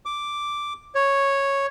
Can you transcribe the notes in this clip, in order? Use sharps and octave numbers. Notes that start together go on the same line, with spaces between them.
D6
C#5